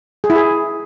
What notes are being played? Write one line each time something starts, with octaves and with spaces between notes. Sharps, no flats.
G#4
E4
G#4